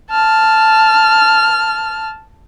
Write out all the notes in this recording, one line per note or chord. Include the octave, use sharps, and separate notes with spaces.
A5 F6